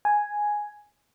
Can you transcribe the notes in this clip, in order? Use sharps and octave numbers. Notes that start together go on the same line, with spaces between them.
G#5